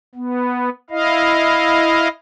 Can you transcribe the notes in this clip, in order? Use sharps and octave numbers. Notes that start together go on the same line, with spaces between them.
B3
E4 D#5 F5